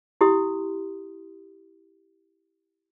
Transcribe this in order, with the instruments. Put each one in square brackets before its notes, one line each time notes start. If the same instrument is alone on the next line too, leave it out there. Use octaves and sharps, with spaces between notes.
[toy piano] E4 G4 C6 D#6